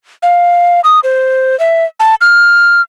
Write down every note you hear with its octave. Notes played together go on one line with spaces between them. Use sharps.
F5
D#6
C5
E5
A5
F6